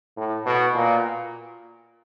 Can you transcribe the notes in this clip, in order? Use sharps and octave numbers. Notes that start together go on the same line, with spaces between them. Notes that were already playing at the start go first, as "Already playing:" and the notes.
A2
B2
A#2